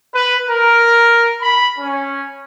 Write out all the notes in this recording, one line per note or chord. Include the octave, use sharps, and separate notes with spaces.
B4
A#4
B5
C#4